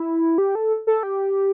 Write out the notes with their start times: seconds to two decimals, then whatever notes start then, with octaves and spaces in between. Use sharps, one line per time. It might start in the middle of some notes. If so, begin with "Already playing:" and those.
Already playing: E4
0.38 G4
0.55 A4
0.87 A4
1.03 G4